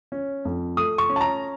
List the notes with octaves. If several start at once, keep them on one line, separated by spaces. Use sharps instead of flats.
C#4
F2
A3 D#6
C#6
C#4
A5
A#5